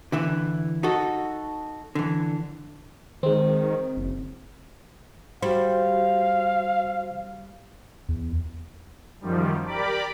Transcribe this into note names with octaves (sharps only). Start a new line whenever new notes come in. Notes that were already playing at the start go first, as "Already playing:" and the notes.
D3 E3 E4
D#4 F#4 A4
D3 E3
D#3 G#3 C4
F#1
G3 F#4 C5 F5
E2
F#2 D#3 F3 G3
G4 A#4 D5 B5 D6